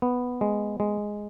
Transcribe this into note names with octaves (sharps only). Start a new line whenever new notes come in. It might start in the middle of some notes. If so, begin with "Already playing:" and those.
B3
G#3
G#3